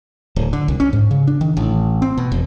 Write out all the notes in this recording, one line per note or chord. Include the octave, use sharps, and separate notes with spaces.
D1
D3
C2
C#4
G#2
C#3
D4
D#3
A1
C4
B2
E1